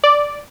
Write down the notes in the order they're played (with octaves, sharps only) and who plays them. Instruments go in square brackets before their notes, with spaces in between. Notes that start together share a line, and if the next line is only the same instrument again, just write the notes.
[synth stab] D5